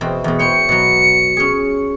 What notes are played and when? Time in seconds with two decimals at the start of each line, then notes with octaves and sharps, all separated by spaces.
0.01 E2 B2 C4
0.24 E2 B2
0.39 C5 C#5 G5 C#7
0.69 B2 F#3
1.37 C#4 G#4